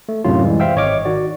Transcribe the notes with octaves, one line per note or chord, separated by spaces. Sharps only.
A3
F#2 A2 C3 F#3 F4
E3 G3 G#3
C5 E5 F5 G5 E6
G#1 C#5 D#5 D6 F6
D#3 F#4 D5